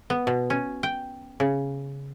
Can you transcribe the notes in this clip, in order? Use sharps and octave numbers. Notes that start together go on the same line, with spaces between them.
B3
B2
C#4
G5
C#3